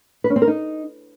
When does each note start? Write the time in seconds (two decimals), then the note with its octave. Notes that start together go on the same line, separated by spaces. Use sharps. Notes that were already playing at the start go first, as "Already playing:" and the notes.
0.24 B4
0.30 C#4
0.36 C4
0.42 A#4
0.48 D#4